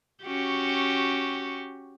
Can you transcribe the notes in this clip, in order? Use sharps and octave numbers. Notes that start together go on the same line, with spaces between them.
C#4 F#4 G4